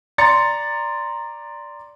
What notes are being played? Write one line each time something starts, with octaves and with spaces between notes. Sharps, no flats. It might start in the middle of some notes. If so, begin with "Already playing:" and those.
D5 A#5 C6 A6 C#7